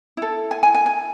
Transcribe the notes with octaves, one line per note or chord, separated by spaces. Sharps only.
E4 A4
G#5
G#5
G#5
G#5